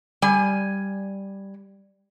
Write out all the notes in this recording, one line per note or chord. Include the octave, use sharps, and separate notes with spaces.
G3 G#5